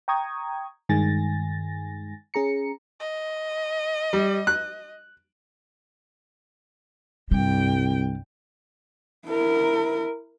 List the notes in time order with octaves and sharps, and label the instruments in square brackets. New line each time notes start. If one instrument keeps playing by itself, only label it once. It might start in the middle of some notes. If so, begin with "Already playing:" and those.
[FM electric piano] G5 A#5 C#6 D#6 G#6
G2 D#3 G#3 G#5 A6 A#6
C#4 G#4 A#5 C#7
[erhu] D#5
[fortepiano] G3
F#6
[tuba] C2 [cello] G2 G5 [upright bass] G3
[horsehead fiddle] E4 A#4